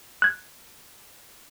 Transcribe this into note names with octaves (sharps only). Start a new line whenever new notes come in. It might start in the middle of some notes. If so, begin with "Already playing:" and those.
F#6 G#6